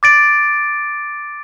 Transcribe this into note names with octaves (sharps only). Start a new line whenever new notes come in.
D6 A6 D7